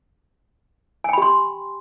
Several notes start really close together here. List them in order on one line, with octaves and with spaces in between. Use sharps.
G#5 G5 B5 G4 C6